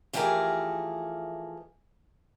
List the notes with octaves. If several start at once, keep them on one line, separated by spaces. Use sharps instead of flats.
E3 F3 A3 G4 G#4 A#4